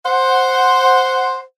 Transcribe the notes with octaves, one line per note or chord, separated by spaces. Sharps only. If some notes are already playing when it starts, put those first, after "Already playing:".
C5 F#5